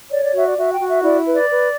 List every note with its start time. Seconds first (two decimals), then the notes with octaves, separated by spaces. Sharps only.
0.10 C#5 D5
0.22 D5
0.33 F#4 E5
0.45 D5
0.57 F#4 E5
0.72 G5
0.79 F#4
0.87 E5
1.02 E4 D5
1.25 B4
1.33 D5
1.48 B4